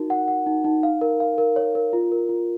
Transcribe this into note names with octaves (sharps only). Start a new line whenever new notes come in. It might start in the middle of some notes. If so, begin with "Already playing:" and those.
Already playing: D#4 F#4 A#4
F#5
F#5
D#4
D#4
F5
A#4
F5
A#4
C#5
A#4
F4
A#4
F4